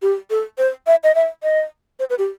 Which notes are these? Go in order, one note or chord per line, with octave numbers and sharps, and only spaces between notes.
G4
A4
C5
E5
D#5
E5
D#5
C5
B4
G4